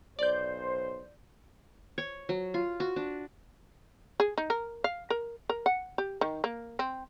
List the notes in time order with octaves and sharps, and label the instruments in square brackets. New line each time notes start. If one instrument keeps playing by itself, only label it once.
[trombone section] B1 C5 [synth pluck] D5 G6
[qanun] C#5
F#3
F4
F#4
D4
[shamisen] G#4
D#4
A#4
F5
A#4
A#4
F#5
G4
D#3
A#3
C4